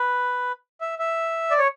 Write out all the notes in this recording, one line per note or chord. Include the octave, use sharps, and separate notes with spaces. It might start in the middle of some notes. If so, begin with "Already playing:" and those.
Already playing: B4
E5
E5
D5
C#5